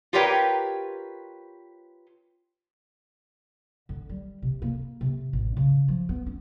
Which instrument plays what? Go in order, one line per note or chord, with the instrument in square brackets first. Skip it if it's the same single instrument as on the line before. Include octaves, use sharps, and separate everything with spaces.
[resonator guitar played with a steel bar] F4 G4 A#4 B4 C#5 G5
[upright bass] D3
G3
C3
A#3
C3
A1
C#3
F3
B3
C#4